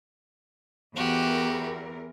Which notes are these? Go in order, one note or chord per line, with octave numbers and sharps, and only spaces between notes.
E2 F#4 G4 A#4